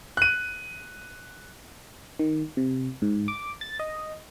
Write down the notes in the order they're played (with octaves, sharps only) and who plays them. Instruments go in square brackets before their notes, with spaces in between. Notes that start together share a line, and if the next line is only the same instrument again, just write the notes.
[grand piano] F#6 D#7
[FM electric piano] D#3
C3
G#2
D6
A6
D#5